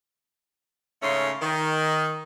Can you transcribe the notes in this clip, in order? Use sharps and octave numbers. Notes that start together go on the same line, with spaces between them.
G#2 C#3 A3 C#4 C6
D#3